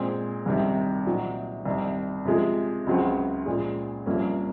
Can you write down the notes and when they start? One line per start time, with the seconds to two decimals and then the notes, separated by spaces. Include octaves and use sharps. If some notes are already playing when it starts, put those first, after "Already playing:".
Already playing: A#2 G#3 C4
0.46 C2 C3 D#3
1.06 A#2 F#3 C4 D#4
1.65 C2 C3 D#3
2.25 C3 F3 G#3
2.87 C#2 C#3 F#3 C4
3.46 A#2 F3 G#3
4.06 C2 C3 F3 A#3 C#4